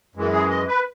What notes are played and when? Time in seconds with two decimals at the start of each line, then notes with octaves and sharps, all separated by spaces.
0.15 F#2 E3 G#3
0.32 G#4
0.50 D#5
0.68 B4